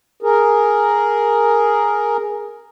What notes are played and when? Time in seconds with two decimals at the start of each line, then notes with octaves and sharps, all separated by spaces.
0.23 G#4 A#4